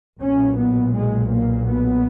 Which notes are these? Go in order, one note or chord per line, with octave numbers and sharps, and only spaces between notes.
B1 A#2 C#4
B3
G#3
A#3
B3